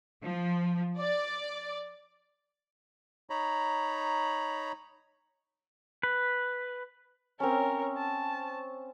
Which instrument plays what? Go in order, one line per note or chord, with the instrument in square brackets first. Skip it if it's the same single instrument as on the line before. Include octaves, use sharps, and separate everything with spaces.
[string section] F3
D5
[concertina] D#4 C#5 A#5 B5
[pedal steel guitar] B4
[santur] C4 C#4 [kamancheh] A#4 C#5
[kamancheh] A5